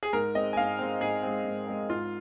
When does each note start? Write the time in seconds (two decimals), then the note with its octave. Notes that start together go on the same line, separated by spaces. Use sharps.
0.03 G#4
0.13 G#2 A#4
0.35 G#3 C4 D#5
0.53 G#5
0.57 G#2 F5
0.79 G#3 C4
1.01 G#2 G#4
1.23 G#3 C4
1.45 G#2
1.67 G#3 C4
1.89 G#2 F4